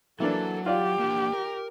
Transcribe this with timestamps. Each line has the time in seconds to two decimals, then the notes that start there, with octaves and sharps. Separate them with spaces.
0.20 E3 F#3 A#3 D4 A4
0.66 F4 G4 D5 F5
0.99 A#3 D4
1.33 A#4